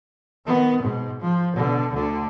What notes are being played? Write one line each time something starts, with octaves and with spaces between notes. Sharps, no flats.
D#3 B3
G#2 B2
F3
B2 D3
D2 D3